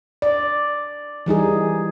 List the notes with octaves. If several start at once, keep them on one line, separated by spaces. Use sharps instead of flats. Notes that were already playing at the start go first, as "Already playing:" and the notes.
D5
E3 G3 D#4 G#4